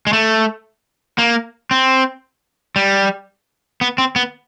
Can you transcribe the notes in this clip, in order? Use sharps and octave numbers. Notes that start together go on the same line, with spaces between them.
G#3
A3
A#3
C4
G3
B3
C4
B3